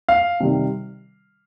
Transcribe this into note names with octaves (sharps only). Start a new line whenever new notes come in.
F5
C3 D#3 G3